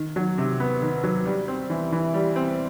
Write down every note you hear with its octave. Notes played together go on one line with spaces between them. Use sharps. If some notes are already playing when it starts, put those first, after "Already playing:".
Already playing: D#3
F#3
C3
B3
D#3
F#3
G3
C4
E3
E3
G3
C4